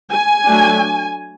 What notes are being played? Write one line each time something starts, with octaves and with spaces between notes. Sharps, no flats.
G#5
F#3 A3 D4